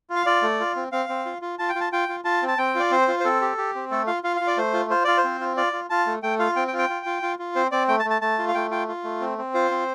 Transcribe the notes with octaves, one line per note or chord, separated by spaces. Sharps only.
F4
F5
F4 D5
A3
F4
C4
C4 F5
C4
F4
F4
F4 A5
G5
F4
A5
F4 G5
F4
F4 A5
C4
A5
C4 G5
F4 D5
C4 C5
F4
C5
C4 A4
G4
G4
C4
A3 A4
F4 F5
F4 F5
F4 F5
D5
A3 C5
F4
F4 C5
F4 D5
C5
C4
F4
F4 D5
F4
F4 A5
A3
A3 G5
F4 F5
C4 G5
G5
F4
G5
F4
F4
F4
F4
C4 C5
C4 D5
A3 G5
A5
A3
A5
A3 A5
F4
F5
A3 G5
F4 G5
F4
A3
C4
C4
F4 C5
C4